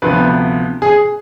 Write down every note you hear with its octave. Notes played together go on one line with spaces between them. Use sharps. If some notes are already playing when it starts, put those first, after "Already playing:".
D2 C3 F3 B3 B4
G#4